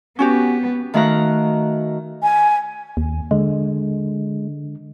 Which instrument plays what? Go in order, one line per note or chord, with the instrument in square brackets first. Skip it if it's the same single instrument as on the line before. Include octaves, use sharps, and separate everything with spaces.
[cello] B3 [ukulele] C#4 F#4 G4
[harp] D#3 A3 F#4 F5 A#5 F#6
[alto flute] G#5
[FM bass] D#2
[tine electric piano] D3 [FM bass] G#3